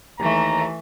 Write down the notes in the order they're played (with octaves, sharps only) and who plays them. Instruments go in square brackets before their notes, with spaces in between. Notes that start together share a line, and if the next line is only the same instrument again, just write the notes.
[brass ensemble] D#2 A#5 [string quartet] E3 A3